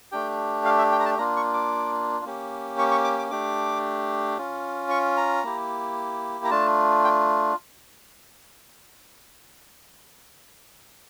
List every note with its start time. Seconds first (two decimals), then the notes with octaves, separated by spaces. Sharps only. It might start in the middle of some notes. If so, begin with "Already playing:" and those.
0.12 A3 D4 G4 G5
0.65 F5
0.78 E5
0.92 G5
1.00 A#5
1.06 A5
1.18 A#3 D4 F4 A#5
1.36 C#6
1.54 D6
2.25 A#3 C#4 G4
2.79 C#6
2.91 C#6
3.04 D6
3.19 D6
3.31 A3 D4 G4 D6
4.38 C#4 F4
4.91 C#6
5.17 A#5
5.44 A#3 E4 G4
6.45 A#5
6.50 A3 D4 F4 A5
7.04 G5